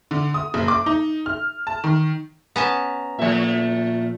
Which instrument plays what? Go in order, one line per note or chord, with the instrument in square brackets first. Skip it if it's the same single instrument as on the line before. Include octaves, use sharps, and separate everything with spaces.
[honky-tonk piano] D3
D#6
F#1
D6
D#4
F6
A5
D#3
[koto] B3 C#4 A5 [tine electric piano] A#5
[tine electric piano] A#2 [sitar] F3 A3 E5